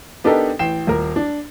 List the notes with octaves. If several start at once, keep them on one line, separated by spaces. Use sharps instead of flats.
B3 D4 D#4 G4 A4 A#4
A1 G5 C7 E7
D#1 A#4
D4